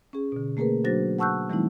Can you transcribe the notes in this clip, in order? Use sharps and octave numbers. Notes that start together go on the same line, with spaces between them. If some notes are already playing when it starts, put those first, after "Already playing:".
C#4 G#4
B2 D3
A3 A#3 G#4 A#4 B4
F#3 D4 F#4 C5 A6 A#6
F#5 A5 C#6 E6 F#6 G6
E3 G3 A3 C4 D#4 E4